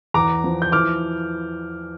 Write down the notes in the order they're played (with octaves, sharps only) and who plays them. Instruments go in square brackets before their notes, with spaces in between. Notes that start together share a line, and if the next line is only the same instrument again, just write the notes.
[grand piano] E2 A#5 D6
F3
G6
E3 D6 F6